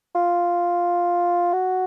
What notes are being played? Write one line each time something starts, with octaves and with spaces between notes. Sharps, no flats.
F4
F#4